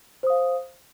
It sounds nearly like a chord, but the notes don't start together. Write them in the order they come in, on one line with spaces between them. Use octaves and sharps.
C5 D#6 F5